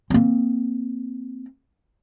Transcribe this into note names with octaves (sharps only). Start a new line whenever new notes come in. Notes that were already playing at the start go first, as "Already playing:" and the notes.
A#3 C4